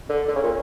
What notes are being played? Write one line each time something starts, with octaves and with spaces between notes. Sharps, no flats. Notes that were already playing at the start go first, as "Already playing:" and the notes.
D3
D3
C#3
A#2